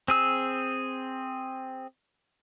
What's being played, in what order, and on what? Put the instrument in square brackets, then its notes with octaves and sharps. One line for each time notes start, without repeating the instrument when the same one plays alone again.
[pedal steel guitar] C4 G#4 E6